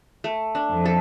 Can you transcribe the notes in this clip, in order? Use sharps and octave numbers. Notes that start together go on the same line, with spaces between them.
A3
D4
F2
A4